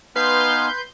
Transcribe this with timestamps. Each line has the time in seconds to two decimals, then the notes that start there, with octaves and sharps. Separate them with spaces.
0.16 B3 D#4 B4 F5 G#5 C6 G6